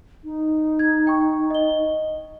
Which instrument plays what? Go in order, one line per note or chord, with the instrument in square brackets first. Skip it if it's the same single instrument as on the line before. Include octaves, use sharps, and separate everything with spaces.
[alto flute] D#4
[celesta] G#6
G5 C#6
D#5 G7